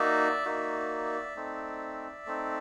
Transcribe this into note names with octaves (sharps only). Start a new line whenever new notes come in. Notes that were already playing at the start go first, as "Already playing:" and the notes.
Already playing: A#3 D#4 F#4 D5 E5
A#3 D#4 F#4
A3 C4 D#4
A3 C4 D#4